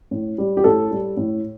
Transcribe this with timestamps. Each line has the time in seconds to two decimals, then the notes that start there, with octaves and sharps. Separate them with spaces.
0.11 A2
0.38 G3
0.57 G4
0.64 A2 A4
0.91 G3
1.17 A2